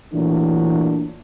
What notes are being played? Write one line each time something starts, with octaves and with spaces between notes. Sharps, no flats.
A#2 E3 F#3 A3 D4